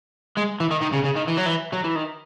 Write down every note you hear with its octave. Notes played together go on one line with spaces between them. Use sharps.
G#3
E3
D#3
D#3
C#3
C#3
D#3
E3
F#3
E3
F#3
E3
D#3